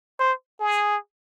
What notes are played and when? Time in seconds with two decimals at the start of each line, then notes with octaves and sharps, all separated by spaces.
0.20 C5
0.60 G#4